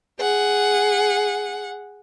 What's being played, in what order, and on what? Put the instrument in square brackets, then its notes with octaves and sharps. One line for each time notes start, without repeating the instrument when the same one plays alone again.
[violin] G#4 F#5